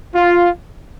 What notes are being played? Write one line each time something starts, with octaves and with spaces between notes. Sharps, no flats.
F4